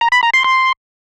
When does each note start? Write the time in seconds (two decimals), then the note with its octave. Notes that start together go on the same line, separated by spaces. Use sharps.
0.01 A#5
0.12 B5
0.23 A#5
0.34 C6
0.44 C6